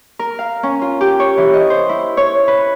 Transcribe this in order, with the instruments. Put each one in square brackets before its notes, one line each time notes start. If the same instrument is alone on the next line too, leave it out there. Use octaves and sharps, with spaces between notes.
[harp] A#4
F5
C#4
F4
G4
C#5
E3
D#5
C5
E4
C#5
B4